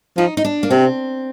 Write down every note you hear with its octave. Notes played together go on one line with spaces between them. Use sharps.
F3 D#4
D#4
D4
A#3
C3 C4